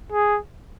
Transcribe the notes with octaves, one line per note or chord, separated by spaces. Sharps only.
G#4